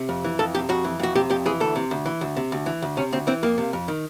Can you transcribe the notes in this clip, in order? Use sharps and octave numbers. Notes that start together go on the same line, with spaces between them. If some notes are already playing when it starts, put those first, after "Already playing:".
Already playing: C3
F2
E3
F2 A4
C3 G4
F2 F#4
E3
F2 F#4
C3 G4
F2 G4
E3 G#4
D2 A4
C3
D2
E3
D2
C3
D2
E3
D2
C3 C#4
D2 C4
E3 C4
F2 A#3
C3
F2
D#3